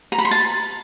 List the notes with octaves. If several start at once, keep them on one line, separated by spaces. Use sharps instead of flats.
A#5
B5
C6
A5